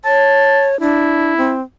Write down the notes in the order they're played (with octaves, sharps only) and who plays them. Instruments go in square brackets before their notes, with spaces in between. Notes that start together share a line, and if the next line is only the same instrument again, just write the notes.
[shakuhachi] C#5 [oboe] A5
[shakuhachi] D4 [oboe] E4
[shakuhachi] C4